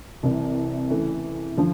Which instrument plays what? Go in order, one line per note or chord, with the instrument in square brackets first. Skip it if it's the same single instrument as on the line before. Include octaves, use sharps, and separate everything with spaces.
[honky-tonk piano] C2 C3 E3
C#3 E3 A3
D3 F3